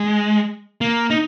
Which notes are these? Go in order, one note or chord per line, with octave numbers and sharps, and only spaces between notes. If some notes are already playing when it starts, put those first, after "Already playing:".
Already playing: G#3
A#3
D#4